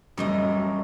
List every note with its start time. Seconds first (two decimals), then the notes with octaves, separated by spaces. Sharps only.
0.18 F#2 A2 E3 G3 D#5